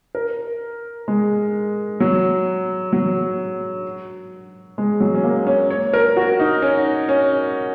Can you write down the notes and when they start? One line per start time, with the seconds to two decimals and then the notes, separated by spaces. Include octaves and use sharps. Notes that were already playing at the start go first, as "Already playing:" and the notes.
0.15 A#4
1.08 G#3
2.00 F#3
2.93 F#3
4.78 G#3
5.00 F#3
5.15 C#4
5.24 A#3
5.47 C#4
5.70 C#5
5.93 A#4
6.17 F#4
6.40 D#4
6.62 C#4
7.09 C#4